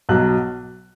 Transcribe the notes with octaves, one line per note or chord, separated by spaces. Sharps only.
B1 B2 F#3 F#6